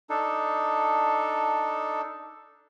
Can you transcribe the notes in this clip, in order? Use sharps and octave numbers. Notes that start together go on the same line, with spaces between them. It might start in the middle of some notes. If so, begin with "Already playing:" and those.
D4 D#4 A4